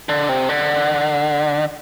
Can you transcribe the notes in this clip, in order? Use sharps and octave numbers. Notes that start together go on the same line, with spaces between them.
D3
C3
D3